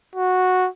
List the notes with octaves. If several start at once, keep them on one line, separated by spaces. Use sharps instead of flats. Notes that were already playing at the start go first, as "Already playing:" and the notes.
F#4